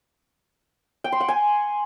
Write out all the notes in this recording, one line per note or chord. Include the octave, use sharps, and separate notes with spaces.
G5
C6
F#5
G#5